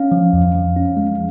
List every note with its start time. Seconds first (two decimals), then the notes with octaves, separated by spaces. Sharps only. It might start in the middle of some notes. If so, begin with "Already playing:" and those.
Already playing: C#4 F5
0.12 F3
0.33 F2
0.55 F3
0.76 C#4
0.97 G#3